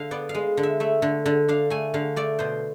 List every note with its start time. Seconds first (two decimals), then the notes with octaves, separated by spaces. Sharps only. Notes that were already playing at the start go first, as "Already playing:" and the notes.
Already playing: D3 F5
0.11 B3 D5
0.29 F5
0.34 G#3
0.57 D3
0.63 E5
0.80 A3 E5
1.02 D3
1.26 D3
1.48 D4 F5
1.70 A3 G#5
1.94 D3 F5
2.16 A3 D5
2.39 B2 C5